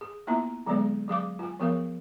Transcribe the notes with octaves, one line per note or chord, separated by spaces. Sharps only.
G#4
A#3 B3 E4 F4 E5 A#5
D3 F#3 G#3 B3 G#4 D5
F#3 G#4 F5 D6
F4 G#5
F3 B3 G#4 A#4 C#5 F5